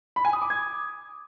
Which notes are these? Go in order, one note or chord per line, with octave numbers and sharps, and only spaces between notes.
B5
G#5
D#6
D6
G#6